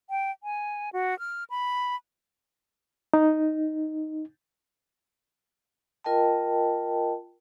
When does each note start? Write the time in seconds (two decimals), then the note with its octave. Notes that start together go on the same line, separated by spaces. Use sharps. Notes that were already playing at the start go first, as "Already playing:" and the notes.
0.10 G5
0.43 G#5
0.93 F#4
1.19 F6
1.50 B5
3.14 D#4
6.04 F4 A#4 D#5 G5 A5